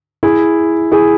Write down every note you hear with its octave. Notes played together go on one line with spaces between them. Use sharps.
E4 G#4
E4 G#4